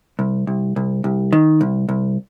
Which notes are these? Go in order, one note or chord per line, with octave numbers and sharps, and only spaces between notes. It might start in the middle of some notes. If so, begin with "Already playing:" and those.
C2
C2
C2
C2
D#3
C2
C2